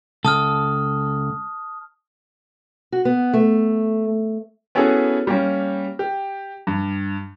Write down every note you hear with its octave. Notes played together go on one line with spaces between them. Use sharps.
C#2 A4 A5 D#6 F6
F#4
B3
A3
B3 C#4 E4 F#4 G#4 A4
G3 A#3 C#4
G4
G2